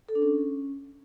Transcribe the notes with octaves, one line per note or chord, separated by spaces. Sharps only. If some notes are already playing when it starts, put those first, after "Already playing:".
A4
D4
C#4